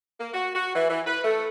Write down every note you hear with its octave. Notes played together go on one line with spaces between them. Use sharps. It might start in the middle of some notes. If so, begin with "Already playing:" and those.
A#3
F#4
F#4
E3
E3
B4
A3